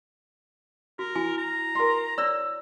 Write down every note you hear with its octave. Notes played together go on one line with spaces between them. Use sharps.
F#4 A#4
E4 F#4 G#5
A#5
A#4 C6
C#5 D5 E6